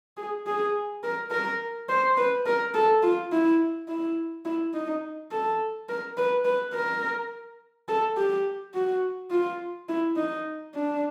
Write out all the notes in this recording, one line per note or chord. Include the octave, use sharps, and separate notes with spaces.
G#4
G#4
A#4
A#4
C5
B4
A#4
A4
F4
E4
E4
E4
D#4
A4
A#4
B4
B4
A#4
A4
G4
F#4
F4
E4
D#4
D4